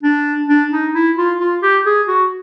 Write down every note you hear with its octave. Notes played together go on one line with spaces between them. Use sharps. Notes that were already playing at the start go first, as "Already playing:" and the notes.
D4
D4
D#4
E4
F4
F4
G4
G#4
F#4